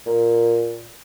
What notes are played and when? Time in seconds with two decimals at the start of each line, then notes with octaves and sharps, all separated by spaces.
0.06 A#2